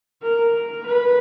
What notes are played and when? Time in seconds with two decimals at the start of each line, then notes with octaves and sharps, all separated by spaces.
0.22 A#4
0.86 B4